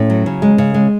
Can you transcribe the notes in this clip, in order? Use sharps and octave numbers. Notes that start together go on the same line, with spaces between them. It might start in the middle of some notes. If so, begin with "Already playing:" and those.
Already playing: A2 C#4
F#3
C#3
G#3
C#3
G#3